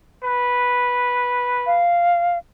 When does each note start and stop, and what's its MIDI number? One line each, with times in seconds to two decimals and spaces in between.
0.24 1.85 71
1.67 2.38 77